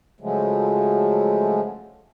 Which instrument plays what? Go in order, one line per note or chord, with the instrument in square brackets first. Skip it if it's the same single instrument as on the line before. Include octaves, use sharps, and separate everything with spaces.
[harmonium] C#3 F3 F#3 G#3 A3